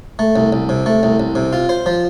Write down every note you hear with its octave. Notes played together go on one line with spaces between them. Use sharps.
A3
C2
C2
C3
A3
C2
C2
C3
F4
C5
F3